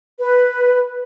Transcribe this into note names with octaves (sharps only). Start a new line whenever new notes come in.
B4